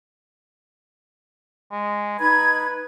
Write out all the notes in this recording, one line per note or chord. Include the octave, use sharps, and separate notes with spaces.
G#3
D#4 B4 B5 G#6